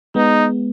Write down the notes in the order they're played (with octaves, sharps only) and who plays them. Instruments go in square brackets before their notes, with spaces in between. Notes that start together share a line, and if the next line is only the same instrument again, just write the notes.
[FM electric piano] G#3 B3 [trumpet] D#4